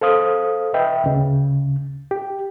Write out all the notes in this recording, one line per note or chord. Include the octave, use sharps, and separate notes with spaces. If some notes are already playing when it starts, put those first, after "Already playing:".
A4 C5 F5 D#6
B4 D#5 E5 G5
D2 C#3
G4